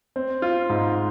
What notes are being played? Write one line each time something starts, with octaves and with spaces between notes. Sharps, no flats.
C4
F4
G#2